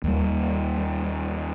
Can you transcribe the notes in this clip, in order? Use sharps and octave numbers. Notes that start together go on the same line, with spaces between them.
D#2 G3